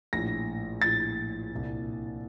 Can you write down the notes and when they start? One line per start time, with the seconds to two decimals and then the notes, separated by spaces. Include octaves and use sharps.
0.13 A#1 A2 A#6
0.82 A#1 A2 A6
1.51 C2 A#2